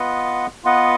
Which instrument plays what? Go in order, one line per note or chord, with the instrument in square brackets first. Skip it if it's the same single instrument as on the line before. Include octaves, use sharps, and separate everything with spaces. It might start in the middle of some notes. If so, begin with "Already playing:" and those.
Already playing: [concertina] B3 F4 B4 D#5 F#5
B3 F4 B4 D#5 F#5